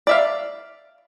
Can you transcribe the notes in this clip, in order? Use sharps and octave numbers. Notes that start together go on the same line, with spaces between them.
D5 E5 F5